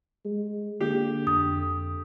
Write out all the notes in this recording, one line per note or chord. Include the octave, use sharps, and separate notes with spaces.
G#3
D3 A#3 G4
F2 D#6